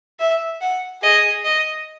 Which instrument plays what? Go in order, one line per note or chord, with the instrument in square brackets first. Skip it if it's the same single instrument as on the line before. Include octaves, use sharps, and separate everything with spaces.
[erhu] E5
F#5
[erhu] G#4 [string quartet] D#5
[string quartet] D#5